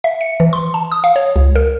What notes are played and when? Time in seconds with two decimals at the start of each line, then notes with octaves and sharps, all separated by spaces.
0.04 E5
0.21 C#7
0.40 E3
0.53 C6
0.74 A5
0.92 D#6
1.04 F5
1.16 C#5
1.36 C#2
1.56 A#4